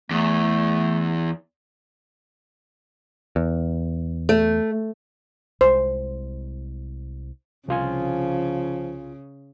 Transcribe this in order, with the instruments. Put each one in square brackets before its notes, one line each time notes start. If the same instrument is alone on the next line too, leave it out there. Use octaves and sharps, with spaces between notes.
[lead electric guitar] E2 [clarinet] A3
[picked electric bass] E2
[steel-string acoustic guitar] A3
[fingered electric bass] C2 G#3 [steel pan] C5
[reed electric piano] C2 F4 G#5 [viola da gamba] C#3 [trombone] F3